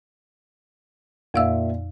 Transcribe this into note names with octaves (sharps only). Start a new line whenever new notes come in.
F2 A#2 E5 F5 E6